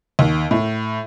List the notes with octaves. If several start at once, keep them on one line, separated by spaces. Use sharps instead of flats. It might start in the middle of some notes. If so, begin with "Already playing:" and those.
D#2
A2